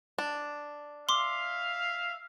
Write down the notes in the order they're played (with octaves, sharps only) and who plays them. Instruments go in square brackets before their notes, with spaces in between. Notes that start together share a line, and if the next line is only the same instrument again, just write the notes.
[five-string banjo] D4
[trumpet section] E5 F5 [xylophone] C6 D6